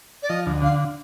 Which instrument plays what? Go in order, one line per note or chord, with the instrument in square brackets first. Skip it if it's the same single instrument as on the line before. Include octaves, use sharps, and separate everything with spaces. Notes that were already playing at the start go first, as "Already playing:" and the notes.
[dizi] D5
[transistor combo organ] F3 [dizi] D#5
[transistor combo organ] D2
[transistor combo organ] D3 [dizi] F5